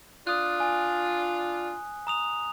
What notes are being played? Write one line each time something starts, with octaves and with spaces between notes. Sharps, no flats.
D4 F4 D#6 F#6
G#5
A#5 D#6 F7